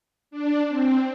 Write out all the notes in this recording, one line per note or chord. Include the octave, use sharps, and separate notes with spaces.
D4
C4